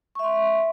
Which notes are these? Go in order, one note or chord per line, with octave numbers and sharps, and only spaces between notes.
E5 C6 C#6